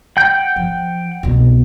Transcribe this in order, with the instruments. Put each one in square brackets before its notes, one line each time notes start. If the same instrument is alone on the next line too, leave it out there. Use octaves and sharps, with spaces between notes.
[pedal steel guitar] F#5 G5 G6
[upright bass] F3
C2 B2